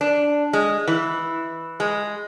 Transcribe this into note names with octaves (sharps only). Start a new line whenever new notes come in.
D4
G#3
E3
G#3